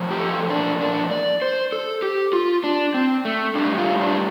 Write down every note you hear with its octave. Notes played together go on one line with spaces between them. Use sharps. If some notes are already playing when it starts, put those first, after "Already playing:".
Already playing: A2 F3
G4
A4
D4
D4
D5
C5
A4
G4
F4
D4
C4
A3
A2 G3 D4
F4
D4